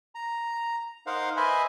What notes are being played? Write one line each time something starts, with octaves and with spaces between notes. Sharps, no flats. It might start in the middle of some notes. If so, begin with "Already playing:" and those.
A#5
D#4 A#4 C5 F5 F#5
B4 C5 D#5 E5 G#5 B5